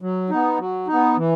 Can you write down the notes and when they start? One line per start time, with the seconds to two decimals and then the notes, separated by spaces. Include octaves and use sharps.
0.02 F#3
0.30 B3 D#4
0.59 F#3
0.87 D#4
0.93 B3
1.17 E3